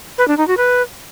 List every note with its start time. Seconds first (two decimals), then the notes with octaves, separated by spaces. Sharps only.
0.18 B4
0.28 D4
0.38 D#4
0.47 F#4
0.57 B4